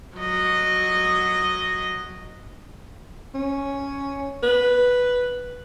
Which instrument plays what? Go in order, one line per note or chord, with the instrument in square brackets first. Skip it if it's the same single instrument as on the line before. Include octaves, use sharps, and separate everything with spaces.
[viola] F#3 D#5
[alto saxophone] C#4
B4